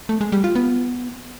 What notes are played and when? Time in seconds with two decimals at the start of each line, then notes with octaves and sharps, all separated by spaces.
0.09 A3
0.21 G#3
0.32 G3
0.44 F4
0.55 B3